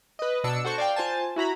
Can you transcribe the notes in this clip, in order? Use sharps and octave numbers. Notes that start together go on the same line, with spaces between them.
B4 D#5
B2 D4 E6 C#7
F#4 A4 C5 C#6
D5 F5 G5
F4 C5 G#5 A5
E4 F#4 A#5 B5